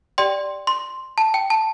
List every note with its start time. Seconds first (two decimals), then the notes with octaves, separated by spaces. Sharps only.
0.18 G4 D5 G5 C6
0.67 C6
1.18 A5
1.34 G5
1.50 A5